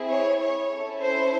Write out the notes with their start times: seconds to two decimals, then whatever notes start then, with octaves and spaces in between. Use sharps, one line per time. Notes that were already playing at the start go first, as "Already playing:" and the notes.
Already playing: C4 E4 G#4
0.11 C#5
0.41 C#5
0.71 C#4 E4 A4
1.02 C5